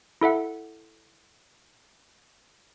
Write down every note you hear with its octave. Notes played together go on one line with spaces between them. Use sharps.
E4 A4 E5 F#5